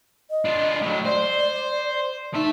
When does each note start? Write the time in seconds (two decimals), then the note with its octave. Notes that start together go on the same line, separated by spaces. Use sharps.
0.30 D#5
0.45 D4 F4
0.82 A2 F#3
1.06 C5 D5
2.35 A3 D#4 E5